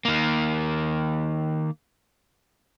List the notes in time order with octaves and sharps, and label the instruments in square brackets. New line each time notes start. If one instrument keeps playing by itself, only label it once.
[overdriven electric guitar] D#3 A#3